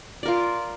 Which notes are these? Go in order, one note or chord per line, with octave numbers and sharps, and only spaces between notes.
F4 A#4 D5